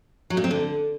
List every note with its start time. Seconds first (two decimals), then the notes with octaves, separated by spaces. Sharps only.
0.30 F#3
0.37 A#2
0.44 C4
0.51 D3